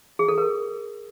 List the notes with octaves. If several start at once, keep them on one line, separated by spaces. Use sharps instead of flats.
G#4
A4
A#4